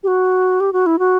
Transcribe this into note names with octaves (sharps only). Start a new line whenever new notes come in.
G4
F#4
G4
F#4
E4
F#4